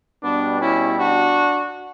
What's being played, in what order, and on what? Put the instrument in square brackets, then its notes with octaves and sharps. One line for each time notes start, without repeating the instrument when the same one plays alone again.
[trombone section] B2 G3 B3 D4
C#4 E4
D4 F#4